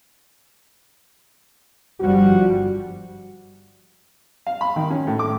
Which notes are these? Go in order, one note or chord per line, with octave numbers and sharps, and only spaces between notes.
G1 F3 G3 F#4
F5
B5
D#3
C#4
A2
D6